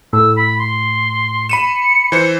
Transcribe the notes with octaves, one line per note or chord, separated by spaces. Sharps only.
A2 E6
B5
C6
B5 C#7 D#7 E7
E3 C5